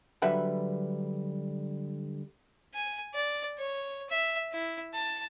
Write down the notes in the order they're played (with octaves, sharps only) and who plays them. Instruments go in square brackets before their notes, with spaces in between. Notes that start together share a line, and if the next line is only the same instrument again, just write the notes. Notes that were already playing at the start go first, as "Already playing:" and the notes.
[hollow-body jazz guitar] D3 F#3 G3 B4 E5 F#5
[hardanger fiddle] G#5
D5
C#5
E5
E4
A5